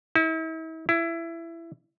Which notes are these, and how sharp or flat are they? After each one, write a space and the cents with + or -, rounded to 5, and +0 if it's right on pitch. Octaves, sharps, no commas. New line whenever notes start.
E4 -40
E4 +20